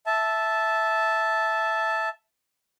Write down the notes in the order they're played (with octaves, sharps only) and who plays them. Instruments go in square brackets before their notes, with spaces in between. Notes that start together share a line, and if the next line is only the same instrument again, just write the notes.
[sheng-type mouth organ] E5 A5